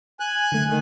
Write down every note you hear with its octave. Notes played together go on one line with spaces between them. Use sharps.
G#5 F#6
D3 A3
D#3